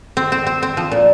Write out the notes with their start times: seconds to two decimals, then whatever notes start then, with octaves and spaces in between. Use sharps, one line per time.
0.17 C4
0.32 C4
0.47 C4
0.62 C4
0.77 F3
0.92 A#2